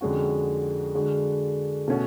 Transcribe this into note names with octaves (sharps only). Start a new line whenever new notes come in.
F2 D3 G#3 C#4 F#4
D3 G#3 D4 F#4
B2 A3 C#4 F#4